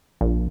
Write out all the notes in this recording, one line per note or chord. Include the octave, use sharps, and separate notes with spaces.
A#1